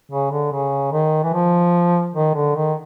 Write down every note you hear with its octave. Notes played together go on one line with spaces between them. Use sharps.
C#3
D3
C#3
D#3
E3
F3
D#3
D3
D#3